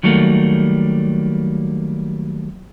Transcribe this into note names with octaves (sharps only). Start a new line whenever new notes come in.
D#3 F#3 G3 A3 A#3